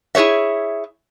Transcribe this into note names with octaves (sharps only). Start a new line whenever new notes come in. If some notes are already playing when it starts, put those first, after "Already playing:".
E4 G#4 C5 C#5 E5